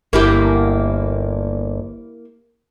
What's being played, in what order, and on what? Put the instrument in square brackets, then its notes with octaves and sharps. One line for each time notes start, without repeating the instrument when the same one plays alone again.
[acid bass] G1 [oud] A#3 E4 G4